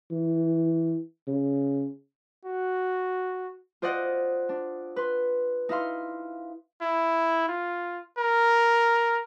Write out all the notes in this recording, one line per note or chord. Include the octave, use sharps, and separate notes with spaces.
E3
C#3
F#4
F4 C5 D5 D#5 F#5
D4
B4 C6
D#4 E4 F5 C6
E4
F4
A#4